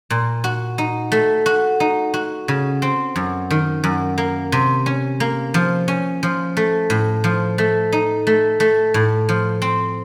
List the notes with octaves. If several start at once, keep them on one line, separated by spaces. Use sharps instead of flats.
A#2
F#4
D#4
A3
F#4
D#4
F#4
C#3
C4
F#2
D#3
F#2
A#3
C3
C#4
A#3
F3
C#4
F3
A3
A2
F3
A3
D#4
A3
A3
A2
F3
C4